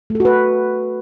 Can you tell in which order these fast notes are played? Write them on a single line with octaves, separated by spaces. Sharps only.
A3 A4 F#4 B4